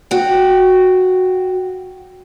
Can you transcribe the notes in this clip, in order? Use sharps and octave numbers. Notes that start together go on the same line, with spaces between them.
F#4 G5